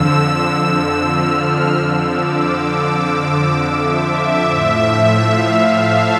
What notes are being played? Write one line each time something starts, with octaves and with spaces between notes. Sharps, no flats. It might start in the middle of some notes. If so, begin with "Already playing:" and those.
Already playing: F2 D3 F3 E6
F6
E6
F2 D3 F3 E6
D6
D6
E5
E5
A2 F3
F5
F5
A5